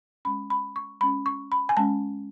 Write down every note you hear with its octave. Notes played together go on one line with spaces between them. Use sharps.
G#3 C#4 B5
B5
C#6
G#3 C#4 B5
C#6
B5
G#5
G#3 C#4 A5